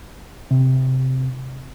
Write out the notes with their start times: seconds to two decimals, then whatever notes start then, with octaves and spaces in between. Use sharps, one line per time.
0.51 C3